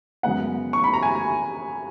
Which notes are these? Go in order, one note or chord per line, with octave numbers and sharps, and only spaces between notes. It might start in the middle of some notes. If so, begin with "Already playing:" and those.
F#2 C#3 G#3 B3 F#5
C#6
B5
A#5
G#5